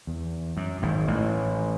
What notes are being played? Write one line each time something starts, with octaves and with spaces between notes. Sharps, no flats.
E2
F#2
G#1 G#2
A1 A2